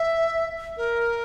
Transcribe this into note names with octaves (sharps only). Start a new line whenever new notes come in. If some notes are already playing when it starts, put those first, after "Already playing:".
Already playing: E5
A#4